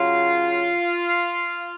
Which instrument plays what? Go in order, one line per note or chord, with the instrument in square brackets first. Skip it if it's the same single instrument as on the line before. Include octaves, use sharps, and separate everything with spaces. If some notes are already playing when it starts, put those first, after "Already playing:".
Already playing: [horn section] C#3 F#3 F4